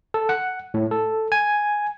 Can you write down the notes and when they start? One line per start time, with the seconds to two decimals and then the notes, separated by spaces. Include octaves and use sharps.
0.14 A4
0.29 F#5
0.74 A2
0.91 A4
1.32 G#5